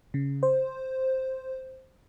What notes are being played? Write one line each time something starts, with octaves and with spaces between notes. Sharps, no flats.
C#3
C5